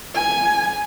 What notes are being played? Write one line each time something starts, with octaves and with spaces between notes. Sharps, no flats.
G#5